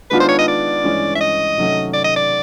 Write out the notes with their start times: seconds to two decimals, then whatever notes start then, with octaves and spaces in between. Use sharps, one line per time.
0.11 D#3 G#3 B3 D4 F4 B4
0.20 C5
0.29 C#5
0.39 D#5
0.48 D5
0.84 G2 E3 G#3 C#4
1.16 E5
1.21 D#5
1.57 C3 D#3 F#3 A3 C#4
1.94 D5
2.04 D#5
2.16 D5